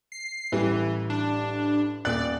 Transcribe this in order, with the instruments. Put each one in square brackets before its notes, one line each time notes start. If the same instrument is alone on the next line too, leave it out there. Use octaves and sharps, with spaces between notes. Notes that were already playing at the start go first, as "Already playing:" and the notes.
[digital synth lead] C7
[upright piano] A1 G3 [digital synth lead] E3
[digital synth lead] D4
[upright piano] D#1 F#6 [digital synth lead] D5